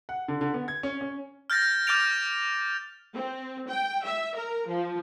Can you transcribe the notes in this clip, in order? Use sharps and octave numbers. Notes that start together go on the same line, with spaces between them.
F#5
D3
D3
B3
G#6
C#4
C#4
F6 G6 A6 A#6
D6 F6 G6 A6 D7 F7
C4
G5
E5
A#4
F3